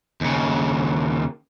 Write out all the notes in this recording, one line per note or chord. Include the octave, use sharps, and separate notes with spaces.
D#2 C#3